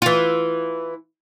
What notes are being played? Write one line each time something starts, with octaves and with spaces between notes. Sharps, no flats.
E3 F4